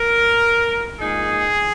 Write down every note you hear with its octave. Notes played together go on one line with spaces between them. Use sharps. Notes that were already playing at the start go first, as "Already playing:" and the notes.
Already playing: A#4
A#2 G#3 D#4 G#4